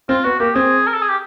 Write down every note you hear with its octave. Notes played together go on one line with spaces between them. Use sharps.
C4 F4
B3 F#4
A#3 G4
C4 G#4
A#4
A4
G#4
G4